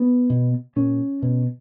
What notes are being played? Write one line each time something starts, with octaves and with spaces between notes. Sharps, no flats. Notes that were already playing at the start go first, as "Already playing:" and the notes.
Already playing: B3
B2
A#2 C#4
B2